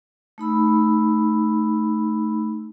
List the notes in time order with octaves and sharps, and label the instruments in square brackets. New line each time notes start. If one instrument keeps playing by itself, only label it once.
[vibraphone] A3 D#4 B5 E6